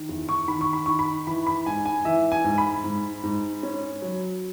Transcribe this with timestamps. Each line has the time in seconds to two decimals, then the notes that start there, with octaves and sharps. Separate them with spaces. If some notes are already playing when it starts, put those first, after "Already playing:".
Already playing: D#3
0.09 E2
0.29 C#6
0.48 D#3 B5
0.61 C#6
0.73 B5
0.86 D#3 C#6
0.99 B5
1.27 E3 B5
1.47 B5
1.66 G#2 G#5
1.86 G#5
2.05 E3 E5
2.32 G#5
2.44 G#2
2.58 B5
2.84 G#2
3.23 G#2
3.63 C#4
4.02 F#3